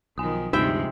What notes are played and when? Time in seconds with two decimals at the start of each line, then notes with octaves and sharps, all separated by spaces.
0.18 B1 D#3 F3 G#5 D#6
0.53 D2 G2 C3 F3 G#3 D#4 E5 G5